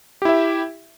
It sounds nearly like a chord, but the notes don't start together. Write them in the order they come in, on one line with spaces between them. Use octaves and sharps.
G4 E4 E5